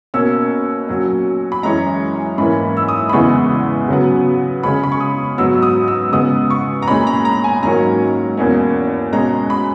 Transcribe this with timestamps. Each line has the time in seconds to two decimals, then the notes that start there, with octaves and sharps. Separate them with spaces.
0.14 B2 A#3 C#4 E6
0.89 A#2 F#3 C#4
1.52 B5
1.63 F#2 E3 G#3 C#4 A#5
2.38 G#2 E3 A#3 C#4 B5
2.77 E6
2.88 D#6
3.09 B5
3.13 E2 C#3 E3 G#3 B3 C#6
3.88 C#3 F#3 B3
4.63 C#3 G#3 C#4 B5
4.83 B5
4.92 C#6
5.00 D#6
5.38 G#2 F#3 B3 E6
5.62 D#6
5.88 E6
6.12 C#3 G#3 B3 D#6
6.50 C#6
6.82 A#5
6.88 A#2 G#3 C#4 B5
7.07 A#5
7.25 A#5
7.44 G#5
7.62 G#2 D#3 F#3 A#3 C#4 A#5
8.37 E2 B2 A#3 C#4
9.13 B2 G#3 C#4 A#5
9.50 B5